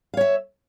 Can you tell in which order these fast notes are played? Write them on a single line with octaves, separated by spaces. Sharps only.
F5 C#5 E5